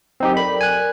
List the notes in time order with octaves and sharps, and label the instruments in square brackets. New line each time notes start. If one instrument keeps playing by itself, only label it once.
[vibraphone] F#3 A#4 [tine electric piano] C4 D#4 G4
[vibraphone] A4 A#4 D5 [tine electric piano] B5
[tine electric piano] G#5 F#6